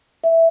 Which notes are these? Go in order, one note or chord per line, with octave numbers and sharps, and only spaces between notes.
E5